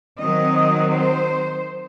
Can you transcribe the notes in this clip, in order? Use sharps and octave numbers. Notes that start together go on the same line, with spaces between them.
D#3 F#3 C4 D#5
C5